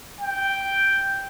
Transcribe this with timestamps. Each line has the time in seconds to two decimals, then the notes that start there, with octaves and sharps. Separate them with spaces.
0.21 G5